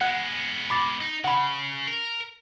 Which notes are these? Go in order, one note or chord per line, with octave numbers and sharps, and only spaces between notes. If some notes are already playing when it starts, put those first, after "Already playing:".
G#3 B3 F#5 F#6
B5 D6 A6
D#4
C#3 F#5 B5
A#4